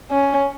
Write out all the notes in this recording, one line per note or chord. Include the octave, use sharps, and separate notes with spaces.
C#4